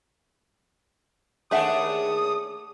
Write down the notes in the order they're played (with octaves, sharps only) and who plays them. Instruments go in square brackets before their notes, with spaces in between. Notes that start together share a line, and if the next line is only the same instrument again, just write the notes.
[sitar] D#2 D4 G#4 [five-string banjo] A3 E5 F#5 [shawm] D#6